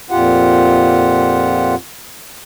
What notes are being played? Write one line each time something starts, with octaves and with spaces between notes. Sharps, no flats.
F2 A#2 F4 G4 F#5